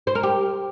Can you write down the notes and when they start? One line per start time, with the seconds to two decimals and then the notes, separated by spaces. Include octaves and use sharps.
0.07 C5
0.15 A#4
0.23 G4